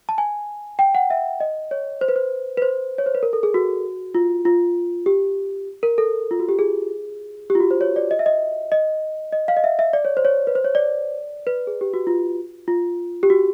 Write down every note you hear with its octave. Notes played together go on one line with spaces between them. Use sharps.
A5
G#5
G5
F#5
E5
D#5
C#5
C5
B4
C5
B4
C5
C#5
C5
B4
A#4
A4
G#4
F#4
F4
F4
G4
A#4
A4
F4
F#4
G4
G#4
G4
F4
F#4
C5
C#5
D5
D#5
E5
D#5
D#5
D#5
F5
D#5
E5
E5
D5
C#5
C5
C#5
B4
C5
C#5
D5
B4
G#4
G4
F#4
F4
F4
G4
F#4